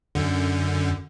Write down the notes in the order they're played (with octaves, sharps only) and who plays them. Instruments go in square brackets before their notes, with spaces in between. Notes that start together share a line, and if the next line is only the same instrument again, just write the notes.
[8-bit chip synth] F#2 D3